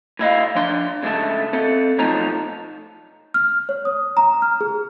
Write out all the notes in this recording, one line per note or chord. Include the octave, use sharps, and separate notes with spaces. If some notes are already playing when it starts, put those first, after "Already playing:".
A2 E4 D#5 F5
F3 D4 C6
C#3 G#3 A3 E5 A5
C4 A4
B1 F3 A3 D#4 A5 A#5
F6
C#5
D#6
A#5
F6
G#4